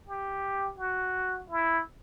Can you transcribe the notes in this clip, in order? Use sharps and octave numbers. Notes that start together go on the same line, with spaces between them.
G4
F#4
E4